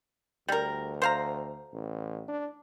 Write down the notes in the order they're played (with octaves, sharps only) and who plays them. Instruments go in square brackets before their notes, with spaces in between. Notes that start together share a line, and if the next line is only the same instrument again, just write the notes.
[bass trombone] D2 [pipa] G3 A#4
[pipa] C5 F5 A#5
[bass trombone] A1
D4